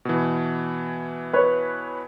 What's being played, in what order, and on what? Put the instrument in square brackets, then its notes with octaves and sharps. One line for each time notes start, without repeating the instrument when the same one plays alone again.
[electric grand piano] B2 E3
[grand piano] B4 C#5